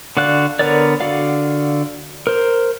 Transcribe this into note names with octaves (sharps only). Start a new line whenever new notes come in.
D3 F#4 D5 F5 F#6
D3 B3 A#4 C#5 D5
D3 F#4 D5 F5
A#4 C5